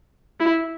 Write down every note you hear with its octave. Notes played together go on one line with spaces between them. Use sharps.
E4